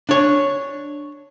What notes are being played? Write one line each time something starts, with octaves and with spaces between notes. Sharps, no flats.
D4 C#5